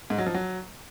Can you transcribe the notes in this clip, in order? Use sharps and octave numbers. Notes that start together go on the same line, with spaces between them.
G#2
F#3
F3
F#3